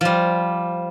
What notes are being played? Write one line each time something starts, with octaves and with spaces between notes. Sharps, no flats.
F3 G3